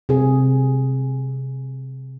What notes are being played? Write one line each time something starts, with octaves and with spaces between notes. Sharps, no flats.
C3 G#4